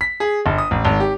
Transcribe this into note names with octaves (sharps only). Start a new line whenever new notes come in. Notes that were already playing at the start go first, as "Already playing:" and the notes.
B6
G#4
G1
D#6
A1
G#1
G4